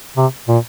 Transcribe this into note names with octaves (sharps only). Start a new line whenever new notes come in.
C3
A#2